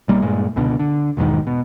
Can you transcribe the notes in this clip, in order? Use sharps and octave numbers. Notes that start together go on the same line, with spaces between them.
B1 G3 A#3
G2 A#2 G#3
C#2 B2 D3
D3
B1 E2 G#2 D#3
B2